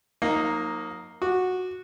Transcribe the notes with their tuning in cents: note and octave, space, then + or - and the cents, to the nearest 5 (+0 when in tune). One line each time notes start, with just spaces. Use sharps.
F#3 -45 A#3 +0 D#4 +5
F#4 -10 D6 +10